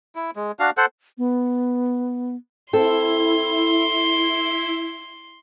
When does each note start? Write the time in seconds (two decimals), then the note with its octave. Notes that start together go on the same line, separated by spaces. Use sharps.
0.15 E4
0.36 G#3
0.59 D4 F#4 F5
0.77 A4 C5 F#5
1.18 B3
2.73 C4 E4 A4 C6